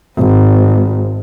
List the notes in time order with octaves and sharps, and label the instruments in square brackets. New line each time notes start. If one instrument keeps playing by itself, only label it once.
[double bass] G#1